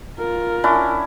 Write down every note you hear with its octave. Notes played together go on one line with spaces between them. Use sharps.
F4 A#4
C#4 D4 E4